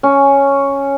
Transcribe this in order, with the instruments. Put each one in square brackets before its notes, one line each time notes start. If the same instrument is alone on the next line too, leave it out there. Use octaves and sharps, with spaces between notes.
[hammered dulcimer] C#4